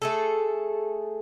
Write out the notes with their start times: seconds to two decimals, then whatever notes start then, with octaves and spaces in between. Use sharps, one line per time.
0.02 A3 G#4 A4